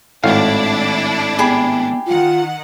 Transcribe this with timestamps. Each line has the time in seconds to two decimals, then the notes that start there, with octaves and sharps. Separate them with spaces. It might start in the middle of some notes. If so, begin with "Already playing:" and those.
0.24 G#1 A2 A3 D4 E4 F5
1.39 B3 G4 G#4 B5
2.06 D#3 F4 F#5